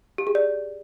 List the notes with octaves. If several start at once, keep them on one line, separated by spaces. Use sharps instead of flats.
G4
G#4
D5